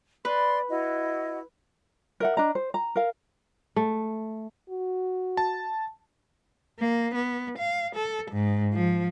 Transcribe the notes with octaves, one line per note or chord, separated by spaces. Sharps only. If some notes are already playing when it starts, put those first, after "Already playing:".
B4 D5 C6
E4 F#4 D#5
A#4 E5 F#5
D4 D#5 A#5
C5
A#5
A#4 F5
A3
F#4
A5
A#3
B3
F5
A4
G#2
F3